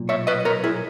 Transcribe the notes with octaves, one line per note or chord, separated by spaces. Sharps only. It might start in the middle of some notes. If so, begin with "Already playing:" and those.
Already playing: B1 A#2
C#5 E5
B4 D#5
A#4 C#5
E4 G#4